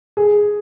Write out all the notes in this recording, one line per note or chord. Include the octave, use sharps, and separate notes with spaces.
G#4